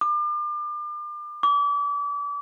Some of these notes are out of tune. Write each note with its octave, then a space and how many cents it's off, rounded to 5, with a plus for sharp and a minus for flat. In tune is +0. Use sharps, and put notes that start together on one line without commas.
D6 +35
D6 -35